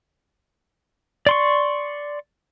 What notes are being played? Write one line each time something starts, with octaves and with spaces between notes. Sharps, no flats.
D5 C6 C#6